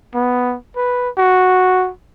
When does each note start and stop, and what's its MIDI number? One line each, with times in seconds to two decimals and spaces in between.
0.15 0.55 59
0.76 1.10 71
1.18 1.90 66